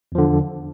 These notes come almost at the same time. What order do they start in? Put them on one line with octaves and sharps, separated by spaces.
E2 F3 D3